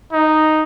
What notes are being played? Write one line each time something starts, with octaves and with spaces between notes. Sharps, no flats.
D#4